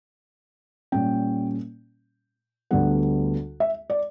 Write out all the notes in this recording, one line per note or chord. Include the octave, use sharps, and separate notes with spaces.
A#2 G3 C#4 G5
D2 D3 G3 B3 F#5
E5
D5